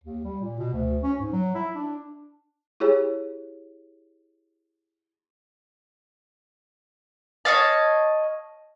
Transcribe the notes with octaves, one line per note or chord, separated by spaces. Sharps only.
D#2
G3
A#2
B2
D2
C#4
G#2
F#3
E4
D4
E4 G4 G#4 C#5
C#5 D#5 F5 A5